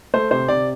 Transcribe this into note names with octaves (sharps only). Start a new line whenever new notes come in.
A3 C5
C3 C5
C3 D5